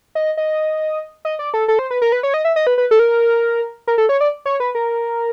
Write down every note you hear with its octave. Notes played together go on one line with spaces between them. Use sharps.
D#5
D#5
D#5
D5
A4
A4
C5
B4
A#4
B4
C#5
D#5
E5
D#5
B4
B4
A4
A#4
A#4
A4
C#5
D5
C#5
B4
A#4